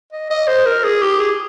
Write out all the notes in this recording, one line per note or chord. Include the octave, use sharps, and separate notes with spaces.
D#5
D#5
C5
A#4
G#4
G4
G#4